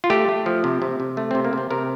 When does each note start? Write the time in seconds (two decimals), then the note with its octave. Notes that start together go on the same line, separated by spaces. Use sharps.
0.04 F4
0.10 A3 G4
0.29 A3
0.46 F3
0.64 C3
0.82 C3
1.00 C3
1.17 A3
1.31 C3 C4
1.45 A#3
1.53 C3 C4
1.71 C3 A#4